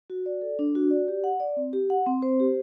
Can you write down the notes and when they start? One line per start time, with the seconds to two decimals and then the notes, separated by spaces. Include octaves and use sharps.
0.10 F#4
0.26 D5
0.42 A4
0.59 D4
0.75 F#4
0.91 D5
1.08 G4
1.24 F#5
1.40 D5
1.57 C4
1.73 G4
1.90 F#5
2.06 C4
2.22 C5
2.40 G4